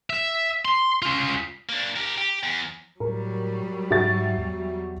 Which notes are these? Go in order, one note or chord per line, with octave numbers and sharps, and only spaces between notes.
E5
C6
C#4 F4
A#3 D4
G4 A#4
G4
E2
A2 F#3 G3 A#4
G#2 F#4 E5 A6
E2